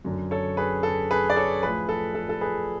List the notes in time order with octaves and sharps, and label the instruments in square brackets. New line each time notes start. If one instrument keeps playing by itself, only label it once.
[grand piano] F#2 D3 F#3
A4 C#5
G#4 B4
A4
G#4 B4
D5
A4 C#5
A2 F3 G#4 B4
A4
A4
A4
G#4 B4